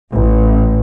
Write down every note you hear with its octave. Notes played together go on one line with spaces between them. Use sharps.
A1